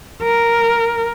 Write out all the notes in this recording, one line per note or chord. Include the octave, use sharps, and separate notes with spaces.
A#4